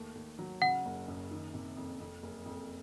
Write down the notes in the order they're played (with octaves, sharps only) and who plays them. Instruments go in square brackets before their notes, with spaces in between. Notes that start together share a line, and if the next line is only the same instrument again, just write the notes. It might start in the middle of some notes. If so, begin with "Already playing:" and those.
Already playing: [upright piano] D#2 A3
D#2
F#3
[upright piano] C#3 [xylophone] F#5
[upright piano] F#1
F#2
D#3
C3
F2
F2
F#1
F2